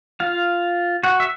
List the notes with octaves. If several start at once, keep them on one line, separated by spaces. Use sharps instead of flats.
F4 F5
F#4 F#5
E5